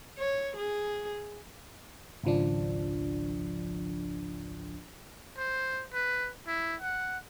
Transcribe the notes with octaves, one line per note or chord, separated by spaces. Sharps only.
C#5
G#4
G#1 C#2 F3 D4
C5
B4
E4
F#5